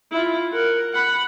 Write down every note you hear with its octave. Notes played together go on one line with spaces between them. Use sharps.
E4 F4
A#4 F#5
F#5 B5